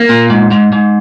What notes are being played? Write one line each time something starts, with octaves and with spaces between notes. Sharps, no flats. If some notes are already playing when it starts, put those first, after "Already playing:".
Already playing: A#3
A#2
G#2
G#2
G#2